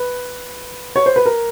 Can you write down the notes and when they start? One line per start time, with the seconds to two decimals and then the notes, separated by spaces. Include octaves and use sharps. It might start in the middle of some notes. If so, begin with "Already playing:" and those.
Already playing: B4
0.96 C#5
1.06 C5
1.16 B4
1.26 A#4